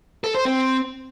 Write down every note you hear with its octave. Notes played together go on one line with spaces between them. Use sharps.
A4
C5
C4